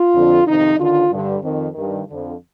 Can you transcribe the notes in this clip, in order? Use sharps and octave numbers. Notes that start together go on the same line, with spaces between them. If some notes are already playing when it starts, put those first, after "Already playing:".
Already playing: F4
F2 D3
F2 C3 D#3 D#4
D#2 D3 F4
G2 D3
F2 D#3
G2 D#3
D3
F2